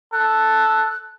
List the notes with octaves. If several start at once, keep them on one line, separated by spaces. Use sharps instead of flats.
A4 F#6